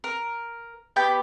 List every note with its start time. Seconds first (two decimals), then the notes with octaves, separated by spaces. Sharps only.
0.04 A#4
0.96 B3 G4 D6 G6